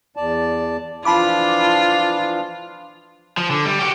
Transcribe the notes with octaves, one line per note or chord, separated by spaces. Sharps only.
E2 D5 A5
E3 F3 D4 F4 A5 B5 D6
F3
D3
G3
F#4 G4